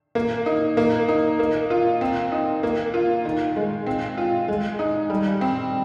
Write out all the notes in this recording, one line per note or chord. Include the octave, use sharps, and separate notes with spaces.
A#3
D#4
A#3
D#4
A#3
F4
C4
D#4
A#3
F4
D#3
G#3
C4
F4
G#3
D#4
G3
C4